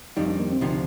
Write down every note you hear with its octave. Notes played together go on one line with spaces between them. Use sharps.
F2 D#3 G3 D#4
D4
A#3
C4
D2 C3 F3 D#4